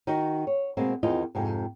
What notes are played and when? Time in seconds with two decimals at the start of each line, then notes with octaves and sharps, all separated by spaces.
0.07 D#3 D#4 F#4
0.47 C#5
0.77 B2 G#3 A#3 C4
1.03 E2 D#3 C4 F4 D#5
1.35 F2 G#2 C3